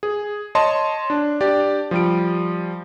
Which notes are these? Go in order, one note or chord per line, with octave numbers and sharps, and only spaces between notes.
G#4
C#5 D#5 A5 C6
D4
D4 G4 D5
F3 G3 D7